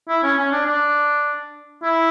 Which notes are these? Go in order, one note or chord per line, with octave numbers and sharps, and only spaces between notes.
E4
C#4
C#4
D4
D4
E4